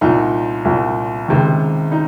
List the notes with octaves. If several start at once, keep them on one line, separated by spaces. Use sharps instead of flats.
C2 A#2 D#4
C2 A#2
C#2 C3 D#3
D#4